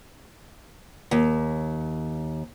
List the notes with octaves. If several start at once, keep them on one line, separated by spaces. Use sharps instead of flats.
D#2